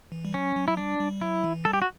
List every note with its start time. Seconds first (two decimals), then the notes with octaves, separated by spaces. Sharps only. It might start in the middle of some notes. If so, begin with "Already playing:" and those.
0.12 E3
0.25 G3
0.34 F#3 C#4
0.56 F#3
0.68 E4
0.77 G3 D4
0.99 G3
1.21 F#3 E4
1.44 E3
1.65 G3 A4
1.73 G4
1.82 F#4